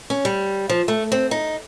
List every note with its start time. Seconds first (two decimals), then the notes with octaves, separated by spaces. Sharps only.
0.10 C#4
0.25 G3
0.70 F3
0.88 A3
1.12 C4
1.31 D#4